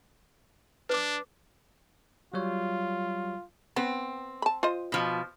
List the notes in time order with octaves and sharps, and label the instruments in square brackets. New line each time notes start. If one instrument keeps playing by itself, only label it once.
[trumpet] D4 [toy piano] B4 D6
[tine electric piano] F#3 G3 C#5 [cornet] F4
[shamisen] B3 [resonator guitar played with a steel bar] C4
[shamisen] A5 B5
F4 C5 D#5
[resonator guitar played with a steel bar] B2 F3